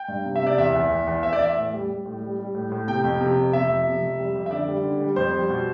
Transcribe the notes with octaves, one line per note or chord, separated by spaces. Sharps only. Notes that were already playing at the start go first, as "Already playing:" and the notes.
Already playing: G5
G2
C3
E5
C3 D5
E2 E5
E2
E2
E2
E2 E5
D5
E2 E5
A2
G3
G3
A2
G3
G3
A2
A2
C3 G5
F2
C3
F2
C3 E5
F2
C3
F2
G3
F2
E5
D3 D5
G3
D3
G3
F2 C5
G3
B2